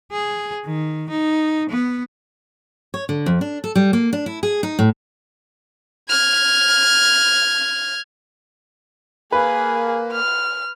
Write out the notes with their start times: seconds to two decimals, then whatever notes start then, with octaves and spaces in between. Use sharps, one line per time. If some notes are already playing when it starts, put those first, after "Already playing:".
0.12 G#4
0.65 D#3
1.10 D#4
1.69 B3
2.94 C#5
3.09 D3
3.26 F2
3.41 D4
3.64 A4
3.76 G3
3.93 A#3
4.13 D4
4.26 E4
4.43 G#4
4.63 D#4
4.79 A2
6.09 F6 G#6
9.32 A#3 G#4 B4
10.12 F6